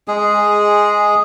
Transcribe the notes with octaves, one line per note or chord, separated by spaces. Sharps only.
G#3 G#4